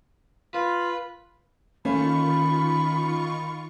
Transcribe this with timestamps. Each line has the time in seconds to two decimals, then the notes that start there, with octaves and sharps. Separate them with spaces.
0.54 F4 B4
1.85 D#3 A3 A#3 C#4 F4 B5 C#6